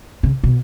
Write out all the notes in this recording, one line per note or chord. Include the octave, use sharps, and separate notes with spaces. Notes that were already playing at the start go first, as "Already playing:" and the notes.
C#3
B2